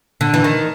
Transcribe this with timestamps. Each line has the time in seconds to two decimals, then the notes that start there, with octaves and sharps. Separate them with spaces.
0.21 D3
0.34 E3
0.44 D#3